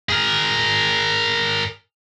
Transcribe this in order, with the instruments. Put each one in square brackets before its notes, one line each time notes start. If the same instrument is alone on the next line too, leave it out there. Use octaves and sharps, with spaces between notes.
[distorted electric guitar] G#4 A#4